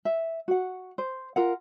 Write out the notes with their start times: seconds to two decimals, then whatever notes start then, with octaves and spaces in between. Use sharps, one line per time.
0.05 E5
0.48 F#4 F#5
0.98 C5
1.36 F4 A#4 F#5